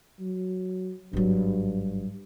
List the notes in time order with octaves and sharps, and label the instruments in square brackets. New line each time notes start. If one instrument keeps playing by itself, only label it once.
[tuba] F#3
[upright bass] G#1 F#3 [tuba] G2